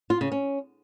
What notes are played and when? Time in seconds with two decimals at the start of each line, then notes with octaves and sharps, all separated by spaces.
0.10 F4
0.21 C#3
0.32 C#4